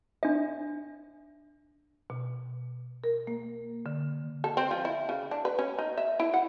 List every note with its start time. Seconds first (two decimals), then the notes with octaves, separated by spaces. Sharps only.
0.23 D4 E5
2.10 B2
3.04 A#4
3.27 A#3
3.86 D3
4.44 A4
4.57 C4
4.71 F3
4.85 E4
5.09 C#3
5.31 D4
5.45 B4
5.59 C#4
5.78 D#4
5.97 E5
6.19 E4
6.34 F#5